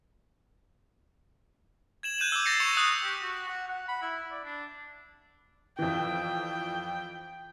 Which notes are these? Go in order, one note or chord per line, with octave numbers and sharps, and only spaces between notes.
G#6 E7 F#7
F#6 G6 D#7 E7 F#7
D6 E6
A6 A#6 C7 C#7
C#6 C#7 E7 F7
D#6 F#6
G4
F#4
F#5
F#5
B5
E4
D5
D4
F2 E3 G5